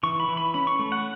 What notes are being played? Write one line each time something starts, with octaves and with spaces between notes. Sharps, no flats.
E3 C#6
B5
E3
B5
C#4 B5
C#6
A3
F#5